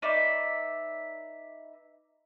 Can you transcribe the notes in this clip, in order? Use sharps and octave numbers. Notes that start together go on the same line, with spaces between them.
D#4 B4 D5 E5